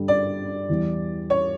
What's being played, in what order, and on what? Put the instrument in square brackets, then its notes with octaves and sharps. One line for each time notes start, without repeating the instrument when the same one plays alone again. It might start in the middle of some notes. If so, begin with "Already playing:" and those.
Already playing: [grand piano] G2 D3 G3
[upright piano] D5
[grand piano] E2 E3 G3
[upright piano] C#5